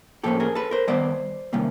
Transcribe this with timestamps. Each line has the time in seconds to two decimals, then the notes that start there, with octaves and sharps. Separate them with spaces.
0.23 A2 F3 A#3 C#4 G4 A4
0.40 G#4 A#4
0.55 A4 B4
0.71 A#4 C5
0.88 D#3 G3 B3 C5 D5
1.53 C3 D#3 G3 A#3 C#4